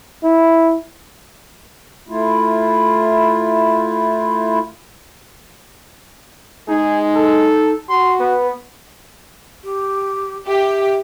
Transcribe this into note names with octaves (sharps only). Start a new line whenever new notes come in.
E4
A3 E4 F4
G#3 D#4 G#4
A4
F#4 C6
B3 B4
G4
G4 E5